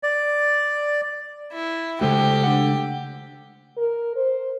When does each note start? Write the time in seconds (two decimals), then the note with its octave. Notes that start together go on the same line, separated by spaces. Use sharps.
0.03 D5
1.52 E4
2.01 C#3 G#3 A3 F#4 G4 A4 C5
2.43 D4 F#5
3.77 A#4
4.16 C5